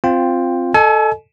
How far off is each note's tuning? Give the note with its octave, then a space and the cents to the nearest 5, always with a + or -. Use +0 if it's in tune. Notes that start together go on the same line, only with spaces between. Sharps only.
C4 +0 F4 +0 G5 +10
A4 +0 D#5 -20 G#5 +35